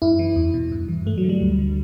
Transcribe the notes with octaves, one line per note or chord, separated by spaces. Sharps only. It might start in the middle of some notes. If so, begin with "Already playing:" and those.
F#2 E4
E3
E2
B2
G2
E3
G2 A3
F#3
D3
G3
D2
D3